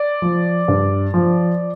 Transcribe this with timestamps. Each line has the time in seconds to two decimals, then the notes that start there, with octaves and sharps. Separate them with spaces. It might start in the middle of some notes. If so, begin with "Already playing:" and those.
Already playing: D5
0.22 F3
0.68 G2
1.14 F3